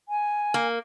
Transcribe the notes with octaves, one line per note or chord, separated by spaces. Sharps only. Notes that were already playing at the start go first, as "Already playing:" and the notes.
G#5
A#3